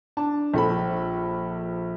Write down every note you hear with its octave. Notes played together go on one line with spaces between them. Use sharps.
D4 A5
A#1 A4 B5